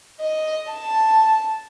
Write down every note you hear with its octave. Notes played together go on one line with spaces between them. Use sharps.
D#5
A5